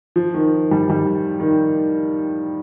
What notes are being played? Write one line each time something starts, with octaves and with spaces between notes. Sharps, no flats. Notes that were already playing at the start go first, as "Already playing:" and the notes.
F3
D#3
G3
G3
D#3